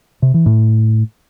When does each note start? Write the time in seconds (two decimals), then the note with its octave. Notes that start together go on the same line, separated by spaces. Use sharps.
0.22 C3
0.34 E3
0.46 A2